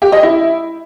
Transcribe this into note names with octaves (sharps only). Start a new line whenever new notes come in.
G4
D#5
E4